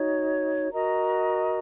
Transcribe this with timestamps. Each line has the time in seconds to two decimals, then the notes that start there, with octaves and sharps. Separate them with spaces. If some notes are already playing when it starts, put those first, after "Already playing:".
Already playing: D#4 F#4 C#5
0.72 F#4 A#4 D#5 A#5